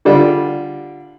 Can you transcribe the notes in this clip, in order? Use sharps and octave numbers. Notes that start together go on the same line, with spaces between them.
D3 G3 D4 F4